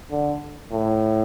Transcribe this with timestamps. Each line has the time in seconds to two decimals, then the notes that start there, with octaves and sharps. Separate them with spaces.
0.11 D3
0.72 A2